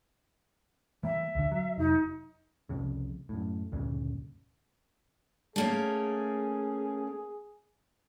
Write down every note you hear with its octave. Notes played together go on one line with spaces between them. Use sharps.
E3 G3 A#3 E5
D2 D3
F#3
F1 F#3 D#4
F1 C2 F2 C#3
F#2 A2
D2 G2 A#2 C#3
A3 A#3 C#4 G#4